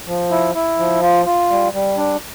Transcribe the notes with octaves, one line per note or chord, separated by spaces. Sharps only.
F3
E4
E4
F3
F4
F4
G3
G3
D4